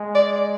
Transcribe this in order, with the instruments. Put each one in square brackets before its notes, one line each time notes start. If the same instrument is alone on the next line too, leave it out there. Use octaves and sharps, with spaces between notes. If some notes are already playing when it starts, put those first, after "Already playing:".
Already playing: [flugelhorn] G#3
[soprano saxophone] D5